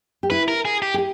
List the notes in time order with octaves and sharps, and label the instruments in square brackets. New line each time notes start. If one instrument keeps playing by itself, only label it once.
[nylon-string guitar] G4
[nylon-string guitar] E4 [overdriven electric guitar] B4
[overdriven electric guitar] A#4
G#4
G4
[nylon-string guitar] G#4
G4